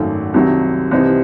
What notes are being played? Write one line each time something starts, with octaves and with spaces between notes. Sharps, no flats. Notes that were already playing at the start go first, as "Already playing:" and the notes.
Already playing: G#1 F#2 D#3 A3
C2 C3 D#3 F#3
C2 C3 E3 C4 D#4